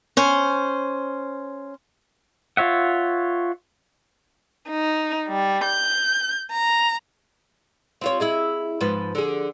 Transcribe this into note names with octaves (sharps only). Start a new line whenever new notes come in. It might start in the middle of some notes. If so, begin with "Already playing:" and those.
C#4 C5
F4 C#5 E5 F#5
D#4
G3
G6
A#5
C4 F4 C#5
E4 G#4 D#5
G#2 F3 B4
D3 G#4